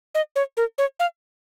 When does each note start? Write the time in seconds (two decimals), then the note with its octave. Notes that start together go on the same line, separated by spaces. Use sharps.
0.15 D#5
0.36 C#5
0.57 A#4
0.78 C#5
0.99 F5